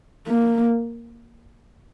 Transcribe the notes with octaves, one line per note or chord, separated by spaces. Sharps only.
A#3